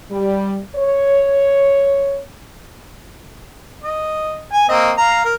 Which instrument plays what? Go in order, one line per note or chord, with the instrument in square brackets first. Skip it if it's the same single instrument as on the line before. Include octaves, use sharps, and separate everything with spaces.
[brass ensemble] G3
C#5
[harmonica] D#5
G#5
A#3 C4 D#5
F5 A#5
A#4